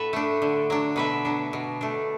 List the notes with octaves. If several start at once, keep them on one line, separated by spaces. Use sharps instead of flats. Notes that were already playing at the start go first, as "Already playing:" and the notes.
Already playing: A2 F#4 A4 B4 E5
A3 D4
D3
F#3 D4
B2 B4 E5
F#3 D4
B2
A3 D4